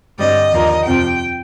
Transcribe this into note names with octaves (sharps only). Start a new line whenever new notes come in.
G2 D3 G3 C4 D#5
D#2 D3 F3 A#3
F2 C3 F3 C4 G5